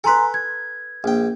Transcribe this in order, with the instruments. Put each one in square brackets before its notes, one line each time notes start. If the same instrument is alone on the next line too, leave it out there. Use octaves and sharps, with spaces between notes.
[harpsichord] A4 B4 [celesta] G#5 A#5 C6
[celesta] G#6
[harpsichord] A#1 G5